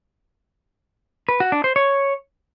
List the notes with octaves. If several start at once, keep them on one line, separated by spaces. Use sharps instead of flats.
B4
F#4
D4
C5
C#5